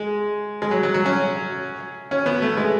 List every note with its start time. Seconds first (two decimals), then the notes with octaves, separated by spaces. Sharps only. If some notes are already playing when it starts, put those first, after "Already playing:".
Already playing: G#3
0.62 G#3
0.71 F#3
0.83 F#3
0.94 F#3
1.06 C#4
2.11 C#4
2.26 B3
2.42 A3
2.57 G#3